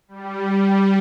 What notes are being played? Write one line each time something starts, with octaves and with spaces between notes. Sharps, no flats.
G3
G3